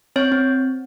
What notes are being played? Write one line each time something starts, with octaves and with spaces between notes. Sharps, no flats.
C4 C#5
C4